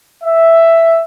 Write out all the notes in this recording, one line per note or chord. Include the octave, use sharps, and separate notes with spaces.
E5